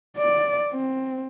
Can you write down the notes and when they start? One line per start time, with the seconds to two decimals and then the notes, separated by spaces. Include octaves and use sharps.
0.17 D5
0.72 C4